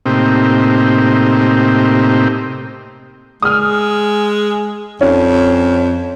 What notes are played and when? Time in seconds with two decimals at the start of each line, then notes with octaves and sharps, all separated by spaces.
0.06 A2 C3 A#3 C4 D#4 G4
3.42 G#3 D#6 F6
5.01 F2 C#4